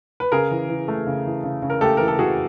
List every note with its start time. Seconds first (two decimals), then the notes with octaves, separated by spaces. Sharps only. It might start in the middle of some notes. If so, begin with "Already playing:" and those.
0.20 B4
0.32 C#3 G#4 A#4
0.51 E3
0.69 E3
0.88 A3
1.07 C#3
1.26 E3
1.44 C#3
1.62 C#3
1.70 A#4
1.81 A3 G4 A4
1.97 E3 A#4
2.08 A4
2.19 E3 F#4 G#4